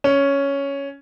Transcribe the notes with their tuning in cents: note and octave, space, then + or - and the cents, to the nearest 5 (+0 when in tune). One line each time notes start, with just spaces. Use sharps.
C#4 +5